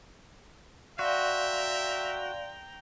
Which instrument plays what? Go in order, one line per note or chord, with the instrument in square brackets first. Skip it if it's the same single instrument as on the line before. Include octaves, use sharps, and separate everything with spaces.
[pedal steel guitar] F#4 [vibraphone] D5 F5 C6 [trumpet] E5 [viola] G5 A#5